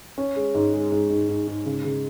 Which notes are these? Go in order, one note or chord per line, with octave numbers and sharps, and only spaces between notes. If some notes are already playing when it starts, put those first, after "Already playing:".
C#4
G#3
G#2
G#3
G#2
G#2
G#2
G#2
C#3
C#3